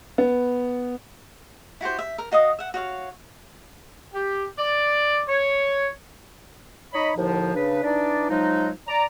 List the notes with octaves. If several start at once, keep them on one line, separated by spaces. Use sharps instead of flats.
B3
E4 F#4 G4 C5
E5
A#4
F#4 D#5 F5 D#6
E5 F#5
F#4 C#5 F5
G4
D5
C#5
D#4 C#5 D#5 B5
D#2 A2 D3 F3
C#3 D4 B4
E3 D4 D#4 D5
F3 F#3 G#3 D#4
D5 A#5